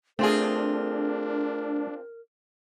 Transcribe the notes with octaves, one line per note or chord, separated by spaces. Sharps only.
A3 C4 D4 F4 G#4 A#4